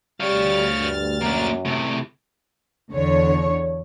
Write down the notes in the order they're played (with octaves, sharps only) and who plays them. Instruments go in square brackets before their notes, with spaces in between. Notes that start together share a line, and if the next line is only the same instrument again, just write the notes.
[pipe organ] D2 F6 A6 [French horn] G3 [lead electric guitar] C#5 F5
[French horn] G2
[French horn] F#2 [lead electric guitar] A#3 D4
[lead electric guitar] A2 C3 [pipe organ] G3
[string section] E2 D3 C#5